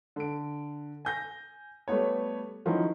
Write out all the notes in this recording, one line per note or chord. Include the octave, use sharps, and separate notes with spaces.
D3 D7
G#5 G6 A#6
G3 A3 B3 C#5
D#3 F3 F#3 C#4 D#4 E4